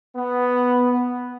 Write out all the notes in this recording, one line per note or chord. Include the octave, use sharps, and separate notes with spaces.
B3